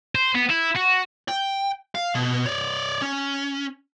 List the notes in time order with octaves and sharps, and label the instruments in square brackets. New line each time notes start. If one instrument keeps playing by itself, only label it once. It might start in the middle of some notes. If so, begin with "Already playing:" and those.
[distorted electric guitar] C5
B3
E4
F#4
[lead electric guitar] G5
F5
B2
C#5 D5
C#4